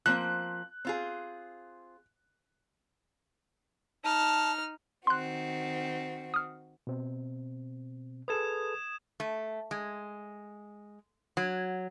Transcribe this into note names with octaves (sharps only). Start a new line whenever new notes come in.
F3 A#3 C4 F#6
C4 F4 G#4
D#4 A5 F6
D#3 C4 F#4 C6 F#6
D#6 F6
B2 C4
G#4 A4 B4 D#6 G#6 E7
A3
G#3
F#3